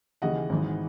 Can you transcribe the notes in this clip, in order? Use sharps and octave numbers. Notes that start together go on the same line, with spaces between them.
D#2 C#3 E3 D#5 F#5
G#1 G#2 E3